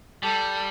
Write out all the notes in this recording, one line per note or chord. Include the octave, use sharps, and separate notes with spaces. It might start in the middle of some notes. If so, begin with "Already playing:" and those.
G3 A4